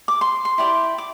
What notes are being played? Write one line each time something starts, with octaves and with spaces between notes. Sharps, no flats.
D6
C6
C6
E4 G4 D5
D6